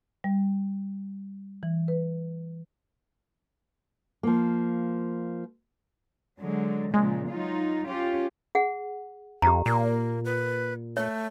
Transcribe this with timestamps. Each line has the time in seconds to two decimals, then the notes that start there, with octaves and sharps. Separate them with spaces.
0.24 G3
1.63 E3
1.88 B4
4.23 F3 A#3
6.40 D3 F#3 G#3
6.94 A#2 C#3 F3 G#3
7.30 F#3 D#4 F4
7.86 C#4 F4 G4
8.55 G#4 F#5
9.42 F2 G4 A#5
9.66 A#2 A#3
10.25 B4
10.97 A3 C#5